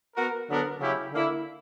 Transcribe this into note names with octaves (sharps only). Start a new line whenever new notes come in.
B3 F#4 A#4
D3 F#3 B3 D4 A#4
C#3 F#3 C#4 E4 G4
D3 A#3 E4